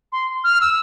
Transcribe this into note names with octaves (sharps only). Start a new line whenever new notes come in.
C6
F6
E6